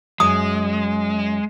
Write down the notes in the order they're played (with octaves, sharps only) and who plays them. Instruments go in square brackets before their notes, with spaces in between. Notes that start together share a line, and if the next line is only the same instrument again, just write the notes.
[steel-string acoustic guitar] F#2 [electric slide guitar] G#3 [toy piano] D#6